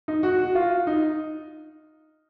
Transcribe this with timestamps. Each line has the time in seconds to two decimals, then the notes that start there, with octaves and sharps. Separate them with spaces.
0.08 D#4
0.23 F#4
0.39 F#4
0.55 F4
0.87 D#4